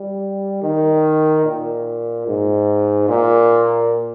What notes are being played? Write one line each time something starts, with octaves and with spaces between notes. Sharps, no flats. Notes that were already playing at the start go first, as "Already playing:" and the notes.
Already playing: G3
D#3
A#2
G#2
A#2